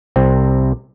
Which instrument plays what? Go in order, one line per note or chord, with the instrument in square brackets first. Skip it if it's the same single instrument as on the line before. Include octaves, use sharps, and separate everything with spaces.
[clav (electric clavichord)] C2 C3 C4